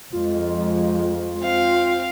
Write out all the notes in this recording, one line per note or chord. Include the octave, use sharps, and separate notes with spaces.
F2 F3 G#3 F4
C4 F5